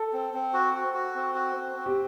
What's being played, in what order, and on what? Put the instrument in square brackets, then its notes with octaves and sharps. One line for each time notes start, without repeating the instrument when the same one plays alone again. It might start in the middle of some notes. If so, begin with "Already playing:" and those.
Already playing: [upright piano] A4
[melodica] C4
C4
F#4
F#4
F#4
C4
F#4
C4
C4
[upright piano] G4